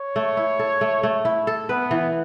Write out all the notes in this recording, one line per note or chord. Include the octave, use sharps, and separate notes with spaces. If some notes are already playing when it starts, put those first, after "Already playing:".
Already playing: C#5
A3
E4
A4
A3
A3
E4
A4
B3 B4
E3